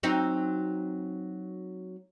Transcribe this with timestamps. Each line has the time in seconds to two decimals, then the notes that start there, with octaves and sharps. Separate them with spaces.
0.03 F#3 C4 D#4